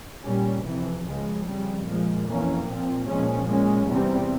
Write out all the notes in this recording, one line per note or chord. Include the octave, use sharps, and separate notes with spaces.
A#2 G3 C#4
F2 C3 E3
C#2 C#3 F3 G#3
F2 C#3 G3
A#2 F3 G#3
F2 E3 A#3 C#4
A#2 F3 C4
A#2 F3 G#3 C#4
A#2 G#3 C#4
E2 C3 G3 C4